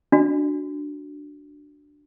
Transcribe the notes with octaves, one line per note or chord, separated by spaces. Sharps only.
D4 F#4